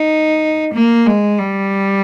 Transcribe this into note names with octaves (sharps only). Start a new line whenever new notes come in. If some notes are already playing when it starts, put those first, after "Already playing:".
Already playing: D#4
A#3
G#3
G3